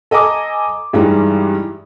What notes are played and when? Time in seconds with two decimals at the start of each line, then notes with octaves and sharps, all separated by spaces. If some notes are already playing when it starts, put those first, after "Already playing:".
0.11 A4 D#5 G#5 A#5 D6 D#6
0.93 G2 E3 G3 G#3 D#4